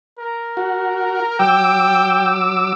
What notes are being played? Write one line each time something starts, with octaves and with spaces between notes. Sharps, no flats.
A#4
F#4
F#3 G5 D6 E6